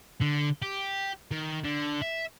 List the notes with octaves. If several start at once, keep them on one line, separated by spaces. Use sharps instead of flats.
D3
G4
D#3
D3
E5